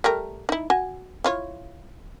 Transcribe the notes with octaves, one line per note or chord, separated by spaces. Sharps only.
G3 A3 A#4
D#4 E4
F#4 G#5
E4 F4 C#5